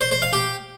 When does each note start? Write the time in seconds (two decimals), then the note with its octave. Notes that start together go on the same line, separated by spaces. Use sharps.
0.01 C5
0.11 C5
0.22 F5
0.33 G4